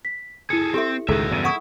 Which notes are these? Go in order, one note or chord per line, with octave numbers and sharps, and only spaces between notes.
B6
E4 G#4 A4 C#7
C4 G4 A4 E5
C#2 A2 D#3 F#4 G#4 A4 E5
E2 G2 C#3
E4 F#5 C#6 D#6